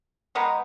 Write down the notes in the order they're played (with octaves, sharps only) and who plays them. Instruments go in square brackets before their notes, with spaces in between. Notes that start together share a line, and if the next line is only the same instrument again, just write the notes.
[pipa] D#3 G#3 B3 D#4